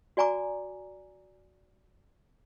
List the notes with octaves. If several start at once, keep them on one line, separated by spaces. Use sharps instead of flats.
F#4 D5 G#5 A#5 D6